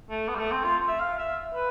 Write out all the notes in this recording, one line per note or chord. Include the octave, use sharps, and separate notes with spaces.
A3
B3
G3
A3
C4
F4
E5
F5
E5
B4